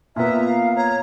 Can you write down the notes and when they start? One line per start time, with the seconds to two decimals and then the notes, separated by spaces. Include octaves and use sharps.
0.16 A#2 B3 E5 A#5
0.44 F5
0.76 C#5 A#5